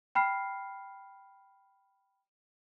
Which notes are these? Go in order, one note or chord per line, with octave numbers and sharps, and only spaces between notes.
G5 B5 F6 C7